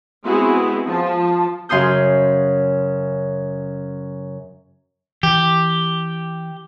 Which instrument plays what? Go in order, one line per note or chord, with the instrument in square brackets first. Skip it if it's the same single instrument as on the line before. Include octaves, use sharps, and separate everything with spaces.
[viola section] G#3 B3 C4 E4 F#4 G#4
F3 A5
[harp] F#2 C#3 C6 D#6 G6
[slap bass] E3 [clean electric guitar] G4